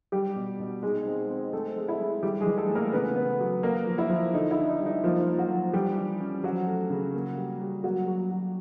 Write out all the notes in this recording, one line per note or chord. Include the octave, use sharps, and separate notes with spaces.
G3 G4
B2
B2
G#3 D#4 G#4
C4
C4
A3 C4 A4
G#3
E4
G#3
E3 G3 G4
G#3 G#4
E3
A3 A4
A2
A#3 A#4
C#3 B3 B4
B3
F#3
A#3 A#4
F3
E4
F3
D3 D#4
E4
D4
D#4
G3
D#4
F3 A#3 F4
A#3
F#3 F#4
F3
E3 G3 G4
E3
C#4
F3 F#3 F#4
A3
C#3
A#3
G3
G3
F#3 A#3 F#4
F#3
F#3